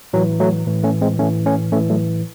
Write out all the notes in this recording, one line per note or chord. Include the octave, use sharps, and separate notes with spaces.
A2 E3 F#3
F#3 A3
A2 E3
A3 C#4
G#3 C4
A2 E3 A3 C#4
A3 C#4
A2 E3 A3 C#4
F#3 A3